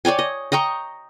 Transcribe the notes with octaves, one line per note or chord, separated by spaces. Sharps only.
C#5 D5 G5 G#5
D#5
D#5 G5 A#5 C#6